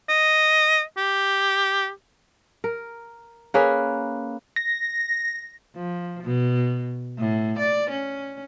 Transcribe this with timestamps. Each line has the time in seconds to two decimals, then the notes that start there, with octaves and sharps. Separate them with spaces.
0.09 D#5
0.97 G4
2.64 A#4
3.54 A#3 C#4 G#4 B4
4.56 A#6
5.76 F3
6.23 B2
7.19 A2
7.59 D5
7.90 C#4